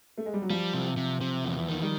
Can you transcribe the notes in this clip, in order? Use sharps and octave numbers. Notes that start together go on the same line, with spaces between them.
A3
G#3
G3
F#3
F3 G3
C3
C3
C3
E2
D#3
G3